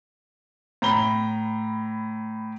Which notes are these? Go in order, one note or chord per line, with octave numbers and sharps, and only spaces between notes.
A2 A#5 B5 G7